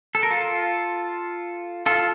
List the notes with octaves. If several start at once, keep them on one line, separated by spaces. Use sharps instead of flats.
A4
A#4
F4 A4
F4 A4